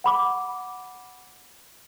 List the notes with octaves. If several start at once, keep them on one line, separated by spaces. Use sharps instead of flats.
F#5 B5 D6